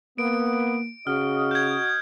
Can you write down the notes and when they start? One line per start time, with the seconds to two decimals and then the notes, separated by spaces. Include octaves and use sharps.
0.18 A#3 B3 D7
1.07 C#3 F#4 D#5 F6
1.51 G6 G#6